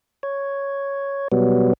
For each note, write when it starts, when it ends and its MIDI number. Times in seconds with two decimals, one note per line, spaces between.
0.23 1.28 73
1.32 1.73 47
1.32 1.73 54
1.32 1.73 55
1.32 1.73 59